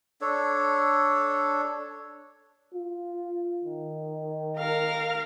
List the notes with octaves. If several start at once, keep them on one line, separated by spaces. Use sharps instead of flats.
D4 A4 C#5
F4
D#3
A#4 F5